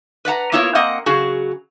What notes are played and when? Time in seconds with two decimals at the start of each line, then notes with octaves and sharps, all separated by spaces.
0.25 B4 D5 F#5 A#5
0.52 A#3 B3 E4 F4 A#4 C#5
0.75 A#3 C4 D#5 F#5
1.06 C#3 F#3 F#4 G#4